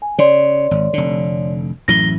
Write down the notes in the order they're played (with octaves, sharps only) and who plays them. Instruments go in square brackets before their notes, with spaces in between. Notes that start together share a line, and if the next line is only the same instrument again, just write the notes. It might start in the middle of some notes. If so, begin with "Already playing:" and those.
[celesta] G#5
[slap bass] C#3 [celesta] C#5 D5 C6
[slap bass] G#1
F1 D3
[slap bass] A1 F#2 E3 [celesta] A#6 G7